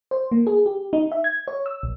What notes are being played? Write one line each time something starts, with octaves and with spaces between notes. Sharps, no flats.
C5
A#3
G#4
G4
D#4
E5
G#6
C#5
E6
A#1